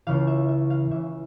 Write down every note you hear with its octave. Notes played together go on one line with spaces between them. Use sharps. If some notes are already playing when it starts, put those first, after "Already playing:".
C#2 C#3 E3 F5
E5
E5
F5
C#2 C#3 E3 E5